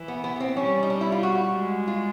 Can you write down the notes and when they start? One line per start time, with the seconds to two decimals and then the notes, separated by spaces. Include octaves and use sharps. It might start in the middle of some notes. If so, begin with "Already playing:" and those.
Already playing: E3
0.08 B3
0.24 B3
0.36 B3
0.40 C4
0.56 G3 C#4
0.83 D#4
0.90 D4
1.01 E4
1.12 F4
1.23 F#4
1.55 G#3
1.88 F4